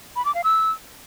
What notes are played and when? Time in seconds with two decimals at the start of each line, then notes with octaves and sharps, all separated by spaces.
0.16 B5
0.25 D6
0.35 F5
0.44 E6